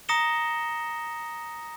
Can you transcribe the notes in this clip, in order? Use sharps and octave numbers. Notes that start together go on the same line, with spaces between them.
A#5 D#6 A#6 C#7 E7 G7